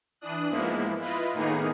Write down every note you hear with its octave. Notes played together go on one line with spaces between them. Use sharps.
E3 D4 D#6 F#6
G#2 F3 G#3 A#3 B3 E4
E4 F4 B4 D#5
A2 D#3 A#3 B3 D#4 G#4